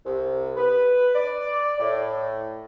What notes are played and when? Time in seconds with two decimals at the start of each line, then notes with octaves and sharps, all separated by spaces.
0.05 C2
0.56 B4
1.14 D5
1.80 A2